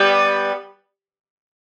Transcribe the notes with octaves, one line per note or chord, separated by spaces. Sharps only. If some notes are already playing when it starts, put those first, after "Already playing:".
Already playing: G3 B3